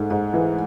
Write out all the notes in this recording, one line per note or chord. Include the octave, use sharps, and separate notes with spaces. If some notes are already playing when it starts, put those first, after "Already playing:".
Already playing: G#2 A3
G#2
E3